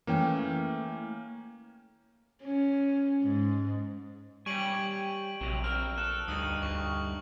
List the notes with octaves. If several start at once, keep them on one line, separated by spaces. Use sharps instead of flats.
E3 A3 A#3 C#4 G5
C#4
G#2
G3 G4 C#5 G#5 C#6 D7 F#7
A#1 C3 F#3
C4 A#4 F6
A4 F#6
D2 G2 D#4 D#6 F#7
D2 C#6